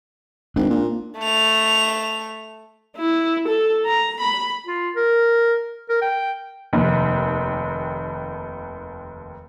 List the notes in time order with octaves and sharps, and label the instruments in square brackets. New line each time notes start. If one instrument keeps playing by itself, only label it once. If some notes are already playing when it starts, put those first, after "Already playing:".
[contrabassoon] G#1 [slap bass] D4
[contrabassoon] A#2
[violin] A3 F7
[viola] E4
A4
A#5
B5
[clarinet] F4
A#4
A#4
G5
[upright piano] F1 D#2